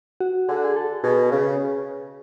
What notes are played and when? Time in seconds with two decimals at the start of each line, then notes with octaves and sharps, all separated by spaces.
0.20 F#4
0.48 D3 G#4
0.57 F#4
0.64 G#4
0.76 A4
1.03 B2 G#4
1.31 C#3